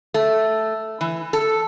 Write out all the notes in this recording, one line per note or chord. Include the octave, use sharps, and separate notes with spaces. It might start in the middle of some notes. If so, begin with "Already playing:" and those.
A3
E3
A4